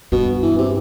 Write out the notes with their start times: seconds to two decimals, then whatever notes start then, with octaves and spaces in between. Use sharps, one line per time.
0.12 G2 B2
0.42 E3
0.58 C3